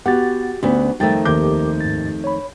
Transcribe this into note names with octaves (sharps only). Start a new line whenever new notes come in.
B3 F#4 G4 F#5 A6
D2 B3 C#4
F2 D#3 G3 A3 G5 A6
D#2 G4 A#4 D6 G6
G#2 A6
C#5 B5